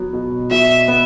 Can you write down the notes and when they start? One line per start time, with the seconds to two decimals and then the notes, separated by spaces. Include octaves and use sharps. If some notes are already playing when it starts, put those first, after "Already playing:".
Already playing: F#3 B3
0.13 B2
0.51 B2 E5
0.88 B3